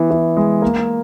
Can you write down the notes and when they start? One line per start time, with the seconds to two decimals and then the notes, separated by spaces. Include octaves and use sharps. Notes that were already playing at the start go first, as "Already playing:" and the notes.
Already playing: E3 B3
0.11 E3
0.37 G#3
0.62 A#3